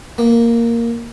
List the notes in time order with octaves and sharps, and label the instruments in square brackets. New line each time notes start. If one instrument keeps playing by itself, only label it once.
[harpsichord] A#3